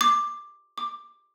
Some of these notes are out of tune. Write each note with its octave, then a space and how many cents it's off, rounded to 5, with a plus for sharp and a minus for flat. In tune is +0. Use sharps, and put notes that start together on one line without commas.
D6 +10
D6 +15